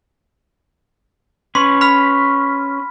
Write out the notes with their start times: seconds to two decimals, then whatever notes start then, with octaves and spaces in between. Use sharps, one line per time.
1.55 C#4 B4 C6
1.81 B5 F6 B6